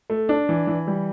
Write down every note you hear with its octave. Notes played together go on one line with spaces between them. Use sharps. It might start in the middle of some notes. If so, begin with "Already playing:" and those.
A3
D4
E3
E3
G3